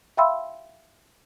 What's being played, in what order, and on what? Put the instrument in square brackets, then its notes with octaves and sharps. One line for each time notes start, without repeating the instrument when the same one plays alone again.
[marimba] E5 F5 G5 B5 C6 E6